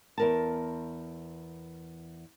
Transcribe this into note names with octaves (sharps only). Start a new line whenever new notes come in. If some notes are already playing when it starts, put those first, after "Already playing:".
E2 A#4 A5